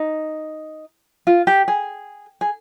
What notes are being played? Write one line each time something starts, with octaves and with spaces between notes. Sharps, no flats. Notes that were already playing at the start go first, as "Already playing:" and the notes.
Already playing: D#4
F4
G4
G#4
G#4